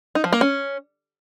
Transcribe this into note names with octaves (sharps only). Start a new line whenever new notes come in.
D#4
F3
A#3
C#4